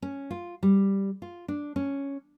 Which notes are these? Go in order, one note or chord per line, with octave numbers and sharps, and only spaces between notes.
C#4
F4
G3
F4
D4
C#4